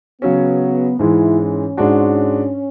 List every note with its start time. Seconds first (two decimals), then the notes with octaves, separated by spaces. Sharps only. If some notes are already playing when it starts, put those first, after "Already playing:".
0.22 C#3 F#3 B3 C#4
0.99 G#2 E3 G#3 E4
1.38 C#4
1.77 G#2 G#3 D4 F#4